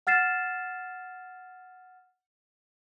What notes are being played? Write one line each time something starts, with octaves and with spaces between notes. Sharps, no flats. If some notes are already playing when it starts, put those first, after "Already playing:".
F#5 F6 A6 C7 E7